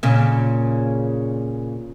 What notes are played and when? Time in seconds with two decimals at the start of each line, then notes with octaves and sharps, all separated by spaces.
0.03 A#2 C#3